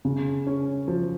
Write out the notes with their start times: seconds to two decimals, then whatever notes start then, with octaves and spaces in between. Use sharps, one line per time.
0.05 C#3
0.47 C#4
0.88 F3